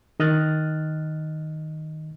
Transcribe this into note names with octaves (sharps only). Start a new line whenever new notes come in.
D#3 D#5 F6 F#6 A6